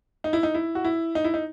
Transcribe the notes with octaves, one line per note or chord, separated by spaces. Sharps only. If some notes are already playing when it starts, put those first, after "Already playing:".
D#4
E4
D#4
E4
F#4
E4
D#4
E4
D#4